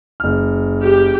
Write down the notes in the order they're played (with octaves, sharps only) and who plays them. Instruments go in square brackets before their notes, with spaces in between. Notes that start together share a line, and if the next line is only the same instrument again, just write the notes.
[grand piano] F#1 F6
[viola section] G4